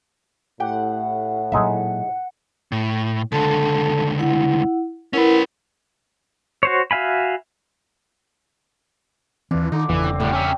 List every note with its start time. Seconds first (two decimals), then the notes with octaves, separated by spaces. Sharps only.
0.60 A2 G4 F#5 G5
1.52 A#2 F#3 G#3 D#4 E5
2.72 A2
3.32 C#2 D3 A4 A5
4.19 E4 F#5
5.13 C#4 E4 A#4 B4 F#5
6.63 F#4 C5 C#5
6.91 F#4 E5 F5 G#5 B5
9.51 D#2 E3 C4 D4 F4
9.72 D3 D#3 D#4
9.89 G1 E2 C#3 E3
10.04 D#1 C4
10.20 A2 D3 F#3 G3 G4
10.32 C#4 E5